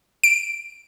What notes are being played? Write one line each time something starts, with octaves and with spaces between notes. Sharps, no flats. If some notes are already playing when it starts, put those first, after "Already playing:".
D7